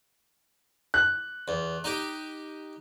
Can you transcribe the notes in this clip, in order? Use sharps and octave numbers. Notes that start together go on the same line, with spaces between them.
F#6
E2
D#4 G4